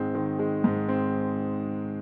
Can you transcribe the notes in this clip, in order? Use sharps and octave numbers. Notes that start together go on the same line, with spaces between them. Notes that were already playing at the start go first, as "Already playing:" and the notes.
Already playing: G#2 D#3 G#3 C4
D#3
G#3
G#2
C4